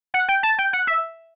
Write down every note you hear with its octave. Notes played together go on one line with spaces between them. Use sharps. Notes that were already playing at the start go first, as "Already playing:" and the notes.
F#5
G5
A5
G5
F#5
E5